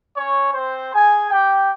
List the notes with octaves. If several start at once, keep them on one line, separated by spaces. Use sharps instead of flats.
C#4 C#5
C4 C5
G#4 G#5
G4 G5